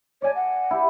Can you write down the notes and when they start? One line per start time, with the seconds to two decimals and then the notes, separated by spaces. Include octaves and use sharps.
0.22 C#5 D5 G#5 A5
0.36 F#5
0.71 E4 G4